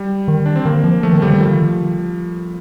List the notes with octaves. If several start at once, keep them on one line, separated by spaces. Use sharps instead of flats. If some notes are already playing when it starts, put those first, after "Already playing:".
Already playing: G3
D#3
D4
C4
D#3 A#3
F3
F3 A3
D#3
D3 G3
D#3
F3